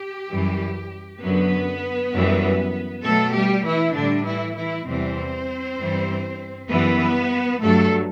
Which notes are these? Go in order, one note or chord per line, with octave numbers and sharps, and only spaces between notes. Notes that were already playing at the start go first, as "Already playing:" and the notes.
Already playing: G4
F#2 E3 G3
F#2 D3 F#3 B3 B4
F#2 E3 G3
B2 F#3 A3 A4
G3 G4
E3 E4
A2 D3 G3 D4
E3 E4
E3 E4
E2 C3 E3 G3 C4 C5
G2 E3 G3
F#2 E3 G3 B3 B4
G2 F#3 A3 A4